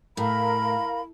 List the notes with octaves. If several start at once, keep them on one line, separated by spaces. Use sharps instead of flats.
A2 A#4 F5 B5